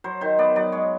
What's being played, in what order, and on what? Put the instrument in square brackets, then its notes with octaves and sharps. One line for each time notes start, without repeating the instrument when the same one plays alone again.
[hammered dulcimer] F#3 C5
D#3 C5
B3 D5
F#3 D5
G#3 C#5